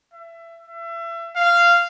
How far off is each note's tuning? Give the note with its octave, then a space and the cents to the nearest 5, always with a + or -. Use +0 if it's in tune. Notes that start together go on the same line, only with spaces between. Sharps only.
E5 +25
E5 +30
F5 -15